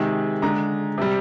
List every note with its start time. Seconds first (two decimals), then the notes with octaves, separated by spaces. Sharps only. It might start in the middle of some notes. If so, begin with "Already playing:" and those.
Already playing: C3 D#3 G#3
0.42 D3 G#3 A#5
0.98 C3 G3